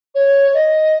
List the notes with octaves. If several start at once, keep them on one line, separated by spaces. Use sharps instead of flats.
C#5
D#5